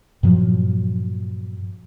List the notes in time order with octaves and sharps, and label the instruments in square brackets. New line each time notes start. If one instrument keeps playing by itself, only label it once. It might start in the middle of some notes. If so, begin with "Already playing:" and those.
[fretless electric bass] G2 A#2 F3 F#3